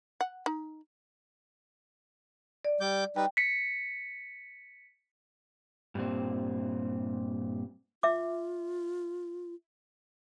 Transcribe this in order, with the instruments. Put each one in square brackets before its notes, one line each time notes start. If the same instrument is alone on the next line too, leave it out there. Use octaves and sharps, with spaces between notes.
[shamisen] F#5
D#4
[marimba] D5
[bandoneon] G3 D6 G6
[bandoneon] G3 D#4 B4 [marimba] G5
[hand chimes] B6 C#7
[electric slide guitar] G2 A#2 C4
[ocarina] F4 [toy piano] E5 D6